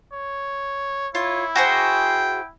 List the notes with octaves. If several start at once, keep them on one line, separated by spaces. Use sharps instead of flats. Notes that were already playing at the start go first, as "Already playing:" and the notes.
C#5
E4 F4 C#5
F#4 G#4 C5 G5